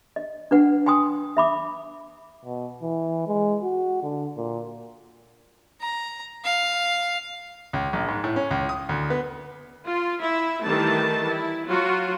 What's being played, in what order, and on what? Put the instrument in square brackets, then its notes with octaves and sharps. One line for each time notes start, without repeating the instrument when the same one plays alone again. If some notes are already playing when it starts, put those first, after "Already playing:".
[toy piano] D#5
D4 B4 F#5
G5 G#5 C6 D#6
E5 B5 D6
[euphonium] B2
E3
G#3
F#4
D3
A#2
[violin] A#5
F5
[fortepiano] C#2
A#1
G#2
A2
C#4
C#2
D#6
D2
B3
[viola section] F4
E4 E5
D#3 E3 G3 A3 A5
E4
F#3 F4 F#4